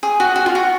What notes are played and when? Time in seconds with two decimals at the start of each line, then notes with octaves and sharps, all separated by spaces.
0.03 G#4
0.20 F#4
0.36 F#4
0.46 F4
0.55 F#4